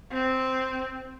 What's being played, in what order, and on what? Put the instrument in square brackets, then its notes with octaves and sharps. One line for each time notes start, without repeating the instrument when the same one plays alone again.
[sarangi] C4